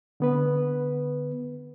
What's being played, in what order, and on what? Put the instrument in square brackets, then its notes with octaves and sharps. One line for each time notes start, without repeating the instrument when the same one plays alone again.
[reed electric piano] D3 B3 B4